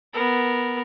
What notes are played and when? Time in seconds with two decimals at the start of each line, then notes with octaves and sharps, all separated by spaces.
0.14 B3 A#4